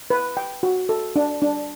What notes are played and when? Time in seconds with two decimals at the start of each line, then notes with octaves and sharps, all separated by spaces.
0.10 B4
0.37 G5
0.63 F#4
0.89 A4
1.16 D4
1.42 D4